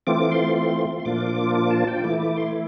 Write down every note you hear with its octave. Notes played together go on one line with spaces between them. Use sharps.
E3 A3 C4 F4 D6
C6
C6
C6
A#2 F3 A#3 D4 F4 D6
D6
A5
G5
E3 A3 E4 D6
D6
C6